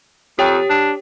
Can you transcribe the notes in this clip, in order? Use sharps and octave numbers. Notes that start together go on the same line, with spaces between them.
F2 G4 C#5 G5
D4